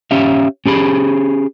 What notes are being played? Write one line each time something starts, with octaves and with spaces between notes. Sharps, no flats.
C#4 G4 E5 F5
C#4 G4 G#4 B5